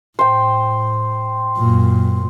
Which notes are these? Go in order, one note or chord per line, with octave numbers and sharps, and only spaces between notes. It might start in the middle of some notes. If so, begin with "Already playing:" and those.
A2 C5 G5
F#2 A#2